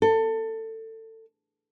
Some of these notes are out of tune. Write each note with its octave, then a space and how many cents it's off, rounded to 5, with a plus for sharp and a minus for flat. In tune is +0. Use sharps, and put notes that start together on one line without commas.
A4 +20